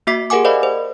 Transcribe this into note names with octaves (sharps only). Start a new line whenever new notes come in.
A#3 F#4 E5 D6 B6 C7
G4 G#4 A#4 F#5 G#5 D6
A#4 C5 D5 D#5 F5 B5
C5